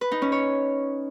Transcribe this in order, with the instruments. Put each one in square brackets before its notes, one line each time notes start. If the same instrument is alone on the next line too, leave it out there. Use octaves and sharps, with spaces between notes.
[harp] B4
D#4
C#4
C#5